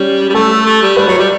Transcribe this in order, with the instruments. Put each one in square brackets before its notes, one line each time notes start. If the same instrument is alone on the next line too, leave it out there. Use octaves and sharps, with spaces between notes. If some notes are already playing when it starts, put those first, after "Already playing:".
Already playing: [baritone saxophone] G3 [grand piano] C#4
[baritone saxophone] G3
[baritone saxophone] A3 [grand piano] A4
[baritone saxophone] A3
G3
[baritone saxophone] G3 [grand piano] B4
[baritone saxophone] F#3 [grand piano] C#5
[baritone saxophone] G3 [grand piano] D5